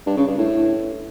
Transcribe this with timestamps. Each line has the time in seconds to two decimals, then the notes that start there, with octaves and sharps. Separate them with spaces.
0.06 G2
0.17 C#3
0.27 G2
0.38 A2